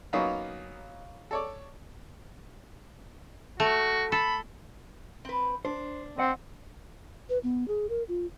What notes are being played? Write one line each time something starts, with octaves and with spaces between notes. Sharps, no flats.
F#3 A#3 B3 C#4 D#4 F4
A4 C#5 D5
A3 F#4
A4 B5
C4 B4
D4 C5
C4 D#5 F#5
B4
B3
G#4
A#4
F4